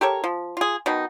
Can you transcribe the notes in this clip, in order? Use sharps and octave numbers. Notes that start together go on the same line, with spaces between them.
G4 A4 A#4 C#5
F3
F4 G#4
B2 D#3 D#4